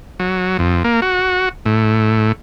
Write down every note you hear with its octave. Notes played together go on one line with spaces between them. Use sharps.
F#3
F2
A#3
F#4
A2